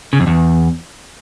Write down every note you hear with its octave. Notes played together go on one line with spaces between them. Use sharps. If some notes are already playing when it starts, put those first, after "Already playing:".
C#3
F2
E2